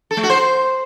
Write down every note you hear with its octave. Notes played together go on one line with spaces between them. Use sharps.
A4
A3
F#4
C5